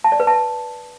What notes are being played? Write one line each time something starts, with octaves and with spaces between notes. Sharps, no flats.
A5
D5
B4
A5